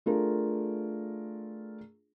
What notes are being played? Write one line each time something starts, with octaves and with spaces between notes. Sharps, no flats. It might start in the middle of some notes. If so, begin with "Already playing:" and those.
A3 D4 F4 G#4 A#4